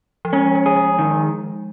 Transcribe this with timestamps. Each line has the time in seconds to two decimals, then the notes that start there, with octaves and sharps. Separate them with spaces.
0.25 F3
0.33 G#3 C#4
0.46 F3
0.55 G#3
0.66 G#4
0.76 G#3
0.99 D#3